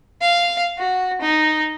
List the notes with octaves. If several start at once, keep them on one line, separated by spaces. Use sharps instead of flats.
F5
F#4
D#4